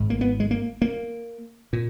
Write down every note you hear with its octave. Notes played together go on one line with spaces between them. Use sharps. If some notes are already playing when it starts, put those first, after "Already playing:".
Already playing: G#1 G#2
A#3
B3
G#3
A#3
A#3
A#2